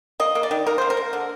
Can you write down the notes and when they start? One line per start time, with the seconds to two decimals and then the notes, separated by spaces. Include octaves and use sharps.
0.20 A#3 D#5
0.35 A#3
0.43 D5
0.51 D#3
0.67 A#3 A#4
0.78 A#3 C5
0.90 A#4
0.97 A#3
1.13 D3